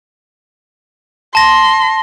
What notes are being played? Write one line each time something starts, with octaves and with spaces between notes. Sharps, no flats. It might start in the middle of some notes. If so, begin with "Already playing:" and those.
A5 C6 A#6